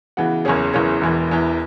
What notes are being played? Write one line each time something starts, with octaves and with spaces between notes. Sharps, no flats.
C#3 E3 B3 F#4
F#1 E2 E3 C#4 G#4
F#1 E2 E3 C#4 G#4
E1 E2 E3
E1 E2 E3